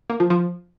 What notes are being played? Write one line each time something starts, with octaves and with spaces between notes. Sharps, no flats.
A#3
F3
F3